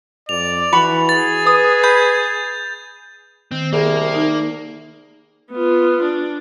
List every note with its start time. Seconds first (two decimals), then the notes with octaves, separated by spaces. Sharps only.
0.29 F2 D5 F7
0.73 E3 F#4 B5 C#6
1.09 G#4 A6
1.46 B4 D#6
1.84 B5 G6
3.52 D#3 C4
3.72 C2 A#3 G#4
4.14 D#4
5.51 B3 F4
6.03 D4